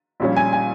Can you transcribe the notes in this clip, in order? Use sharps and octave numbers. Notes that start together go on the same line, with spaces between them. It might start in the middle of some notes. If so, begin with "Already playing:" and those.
A#1 A#2 G3 C#4
G#5
G#5